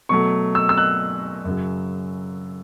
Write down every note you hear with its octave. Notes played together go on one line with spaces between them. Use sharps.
B2 F#3 A3 C#6
E6
E6
F#6
F#2 C#3 F#3